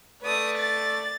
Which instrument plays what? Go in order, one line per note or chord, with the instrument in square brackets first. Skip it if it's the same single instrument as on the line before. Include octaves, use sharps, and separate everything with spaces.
[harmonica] A3 D5 [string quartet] B4 D#6
[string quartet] A6